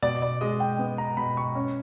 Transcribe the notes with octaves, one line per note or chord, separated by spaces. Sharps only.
B2 D5
D5
G#3 D#5
G5
B3
A#5
B2 B5
C#6
C#4